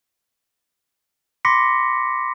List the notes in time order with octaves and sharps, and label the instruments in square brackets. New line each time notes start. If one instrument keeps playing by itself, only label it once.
[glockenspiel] B5 C6 D6 A#6 B6 C#7